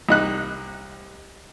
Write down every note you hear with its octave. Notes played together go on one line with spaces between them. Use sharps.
C2 D#4 F#6